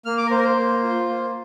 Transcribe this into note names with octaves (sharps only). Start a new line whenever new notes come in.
A#3 F6
D6
A#4
A#3 C5
A#4
C5
A#3
F4
A#3